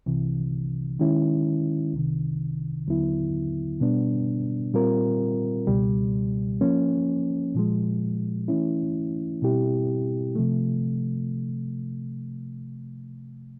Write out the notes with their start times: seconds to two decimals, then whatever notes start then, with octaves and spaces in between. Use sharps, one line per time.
0.06 C2 C3 E3
0.99 D#3 G#3 C#4 E4
1.93 C2 C3 D#3
2.87 D#2 D3 F#3 B3 E4
3.80 B2 G3 B3 D4
4.74 A#2 G3 C4 F4 A#4
5.67 C#2 B2 G3
6.61 F3 A#3 C#4
7.55 A#2 F3 G#3
8.48 E3 A3 C#4 E4
9.42 B2 G3 C4 E4 G4
10.36 C3 F3 A3